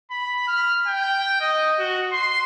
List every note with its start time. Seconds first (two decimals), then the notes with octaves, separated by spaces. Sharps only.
0.11 B5
0.47 F6
0.87 G5
1.41 D#5
1.79 F#4
2.12 C6